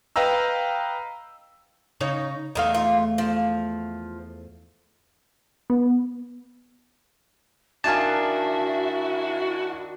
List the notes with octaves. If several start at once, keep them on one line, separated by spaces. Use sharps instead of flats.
B4 D#5 F5 G5 A#5 E6
C#3 D#4 C#5
E2 A3 D#4 A#4 F5
F4
F3
B3
D#3 D4 E4 F#4 E5 F5 G#5 A5